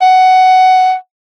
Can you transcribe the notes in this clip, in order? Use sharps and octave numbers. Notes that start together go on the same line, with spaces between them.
F#5